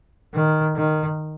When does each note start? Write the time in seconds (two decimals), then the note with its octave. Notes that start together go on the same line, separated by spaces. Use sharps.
0.34 D#3
0.76 D#3